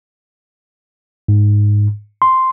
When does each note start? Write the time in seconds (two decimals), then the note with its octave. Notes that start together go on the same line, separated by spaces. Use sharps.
1.28 G#2
2.22 C6